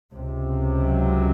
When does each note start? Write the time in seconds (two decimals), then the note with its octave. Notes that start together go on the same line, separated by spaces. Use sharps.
0.13 C#2 C3
0.79 F#3